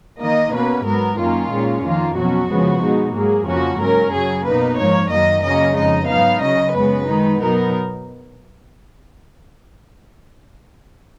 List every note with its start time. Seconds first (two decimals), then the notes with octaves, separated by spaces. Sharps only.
0.20 D#3 A#3 D#4 D#5
0.52 B2 A#3 C#4 B4
0.85 G#2 F#3 B3 A#4
1.18 F#2 D#3 A#3 C#4 F4
1.51 A#2 G#3 C#4
1.83 F2 D#3 A#3 F4
2.16 B2 F#3 C#4 F#4
2.49 C#3 F3 G#3 B3
2.82 B2 G#3 D#4
3.14 G#2 F#3 A#3 G#4
3.47 F2 C#3 F3 A#3 C#4 F#4
3.80 G#2 F#3 C#4 A#4
4.13 F#2 C#3 F#3 G#4
4.45 B2 A#3 D#4 B4
4.79 G#2 F3 A#3 C#5
5.11 F#2 D#3 F#3 A#3 D#5
5.43 C#3 F#3 A#3 C#4 D#5
5.76 F2 F3 G#3 D#4 D#5
6.09 G#2 F#3 B3 D#4 F5
6.41 C#3 F#3 C#4 D#5
6.75 F#2 C#3 G#3 B3 B4
7.08 D#3 G#3 D#4
7.40 B2 F#3 B3 D#4 A#4